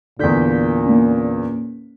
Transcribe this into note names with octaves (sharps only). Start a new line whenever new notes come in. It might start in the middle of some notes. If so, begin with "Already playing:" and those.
E2 A#2 D3 D5 G6 B6
A#3 C#4